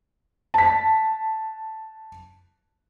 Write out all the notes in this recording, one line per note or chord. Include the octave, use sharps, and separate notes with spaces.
A5 B6